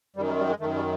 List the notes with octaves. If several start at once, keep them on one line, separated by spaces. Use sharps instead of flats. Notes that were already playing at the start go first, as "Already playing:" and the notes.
F#2 D#3 G3
G3
G3
G#3
F#2 D#3 A3
G3